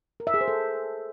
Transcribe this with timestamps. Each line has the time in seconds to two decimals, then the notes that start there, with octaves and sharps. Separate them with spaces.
0.20 A#4
0.27 E5
0.34 G#4
0.41 C5
0.48 A4